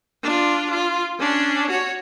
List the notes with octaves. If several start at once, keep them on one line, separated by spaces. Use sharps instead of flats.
D4 F4
F4
C#4 D4
F#4 C#5